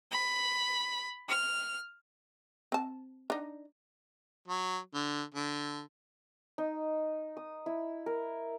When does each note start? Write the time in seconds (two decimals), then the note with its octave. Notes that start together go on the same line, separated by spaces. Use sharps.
0.11 B5
1.28 F6
2.72 C4 A5
3.30 D4 D#4
4.48 F#3
4.94 D3
5.34 D3
6.58 D#4
7.37 D#6
7.66 E4
8.06 A#4